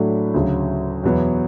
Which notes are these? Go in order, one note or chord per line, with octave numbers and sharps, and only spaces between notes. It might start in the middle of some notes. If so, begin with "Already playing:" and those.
Already playing: A2 F#3 A3 D4 F#4
D2 C#3 F#3
E2 B2 F#3 B3